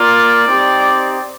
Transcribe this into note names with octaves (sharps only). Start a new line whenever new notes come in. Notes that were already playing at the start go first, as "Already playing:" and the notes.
Already playing: A#3 F4 D5
C4 D#4 G4